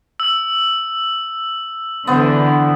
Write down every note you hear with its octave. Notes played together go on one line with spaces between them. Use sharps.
E6
D3 E3 B3 C5